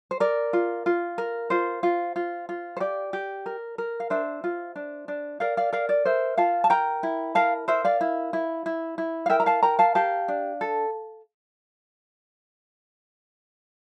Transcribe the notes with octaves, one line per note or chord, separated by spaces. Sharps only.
C5
A#4 D5
F4
F4
A#4
F4 C5
F4
F4
F4
C5
G4 D5
G4
A#4
A#4
F5
D4 C5 E5
F4
D4
D4
A#4 D5 F5
D5 F5
A#4 D5 F5
D5
A#4 C5 E5
F4 F5 A5
A5
A#4 G5 A#5
E4
A#4 F5 A5
A#4 C5 E5
D5 F5
E4
E4
E4
E4
F5
A#4 E5 G5
A#5
F5 A5
A#4 G5 A#5
F5 A5
G4 F5 A5
D4
A4